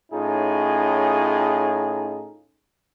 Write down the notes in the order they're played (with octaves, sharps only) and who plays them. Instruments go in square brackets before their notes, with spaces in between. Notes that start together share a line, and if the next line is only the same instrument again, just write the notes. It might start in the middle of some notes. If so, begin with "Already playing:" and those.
[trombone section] A2 C#4 D#4 F4 G#4